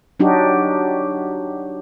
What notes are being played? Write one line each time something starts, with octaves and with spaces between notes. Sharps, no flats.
F#3 D4 D#4 F#4 G4